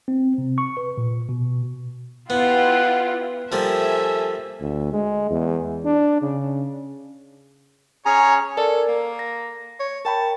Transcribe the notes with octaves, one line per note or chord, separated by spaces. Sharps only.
C4
C3
C#6
B4
A#2
B2
B3 E4 F4 G4 F#5
F3 G3 A#3 A4 E5 G#5
D2
G#3
E2
D4
C#3
C#4 G#4 C#5 G#5 A#5
A4 A#4 D5
A#3
A#6
C#5
A#4 G5 A5 B5